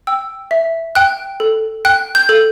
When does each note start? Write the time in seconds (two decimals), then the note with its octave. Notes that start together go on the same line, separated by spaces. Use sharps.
0.07 G5 E6
0.51 E5
0.95 G5 F#6
1.40 A4
1.85 G5 F#6
2.15 G6
2.29 A4